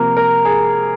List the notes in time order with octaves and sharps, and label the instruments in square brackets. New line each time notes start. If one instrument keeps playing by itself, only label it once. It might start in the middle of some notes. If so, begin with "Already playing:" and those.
Already playing: [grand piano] C3 F3 A#3 A#4
A#4
G#4